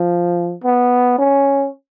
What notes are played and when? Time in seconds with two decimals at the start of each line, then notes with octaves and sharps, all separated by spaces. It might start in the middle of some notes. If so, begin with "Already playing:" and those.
Already playing: F3
0.64 B3
1.19 C#4